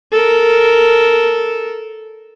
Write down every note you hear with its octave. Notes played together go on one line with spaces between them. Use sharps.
A4 A#4